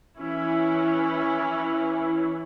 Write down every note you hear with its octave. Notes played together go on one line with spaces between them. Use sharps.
E3 C#4 E4